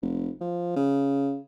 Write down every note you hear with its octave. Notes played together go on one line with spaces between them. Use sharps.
F1
F3
C#3